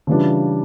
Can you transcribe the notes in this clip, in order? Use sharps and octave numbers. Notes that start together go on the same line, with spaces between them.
C#3 E3 G3 D4 F4